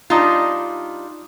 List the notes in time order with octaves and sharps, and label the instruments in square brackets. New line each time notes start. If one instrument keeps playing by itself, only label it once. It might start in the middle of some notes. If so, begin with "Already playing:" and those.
[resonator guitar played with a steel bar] G3 D4 D#4 F4